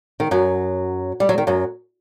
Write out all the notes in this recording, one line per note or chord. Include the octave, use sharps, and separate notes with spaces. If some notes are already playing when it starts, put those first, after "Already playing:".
D#3
F#2 F#3
G3
F#3
D#3
F#2 F#3